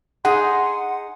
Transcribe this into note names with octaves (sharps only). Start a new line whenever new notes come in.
D#4 G#4 F#5 C6